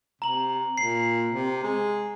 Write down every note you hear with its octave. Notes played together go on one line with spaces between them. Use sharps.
C3 A#5 F#7
A#2 C7
C3
G#3